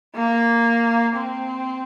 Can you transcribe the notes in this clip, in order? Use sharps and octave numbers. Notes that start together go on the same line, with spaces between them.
A#3
C4